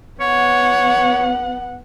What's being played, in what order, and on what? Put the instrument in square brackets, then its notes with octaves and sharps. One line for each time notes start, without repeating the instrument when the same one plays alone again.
[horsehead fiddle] B3 F#5 [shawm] C#5